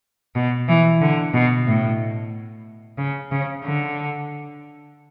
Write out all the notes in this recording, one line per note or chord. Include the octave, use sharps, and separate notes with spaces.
B2
E3
D3
B2
A2
C#3
C#3
D3